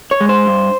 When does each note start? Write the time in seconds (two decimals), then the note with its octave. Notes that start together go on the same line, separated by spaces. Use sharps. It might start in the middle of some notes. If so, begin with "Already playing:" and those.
0.11 C#5
0.20 G#3
0.29 C5
0.46 G2